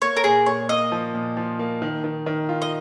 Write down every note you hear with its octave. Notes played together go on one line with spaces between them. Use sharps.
A#3 C#5
A#4
A#2 G#4
A#2 C#5
A#3 D#5
F3
A#2
F3
A#3
D#3
D#3
D#3
F4
D#5